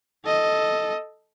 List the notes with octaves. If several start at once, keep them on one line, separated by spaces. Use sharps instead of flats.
A4 D#5